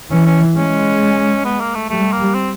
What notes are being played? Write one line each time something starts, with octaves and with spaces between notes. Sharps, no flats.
E3 C#4
C#4
G#3 C#4
B3
A#3
A3
G3 A3
A#3
C4